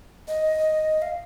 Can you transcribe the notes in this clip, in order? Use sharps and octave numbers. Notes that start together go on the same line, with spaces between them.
D#5
F5